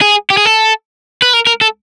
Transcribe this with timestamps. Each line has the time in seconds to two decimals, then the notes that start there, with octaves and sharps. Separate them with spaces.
0.01 G#4
0.30 G4
0.37 G#4
0.45 A4
1.22 B4
1.33 A#4
1.47 A#4
1.61 A4